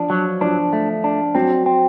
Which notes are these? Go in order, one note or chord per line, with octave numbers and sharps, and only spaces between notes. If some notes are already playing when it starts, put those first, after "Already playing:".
Already playing: F3 D4
F#3
F3 D4
A3
D4
F#3 C4
C4